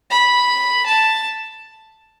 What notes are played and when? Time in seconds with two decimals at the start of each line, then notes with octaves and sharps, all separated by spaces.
0.10 B5
0.86 A5